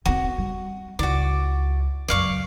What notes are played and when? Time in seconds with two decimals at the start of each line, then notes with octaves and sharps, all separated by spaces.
0.05 D#3 C4 F#4
0.38 G3
0.99 C#2 E4 F#4 D5
2.08 C#2 F#2 D5 F5 C#6